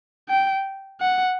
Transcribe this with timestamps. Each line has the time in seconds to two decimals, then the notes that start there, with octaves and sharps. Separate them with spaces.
0.29 G5
1.01 F#5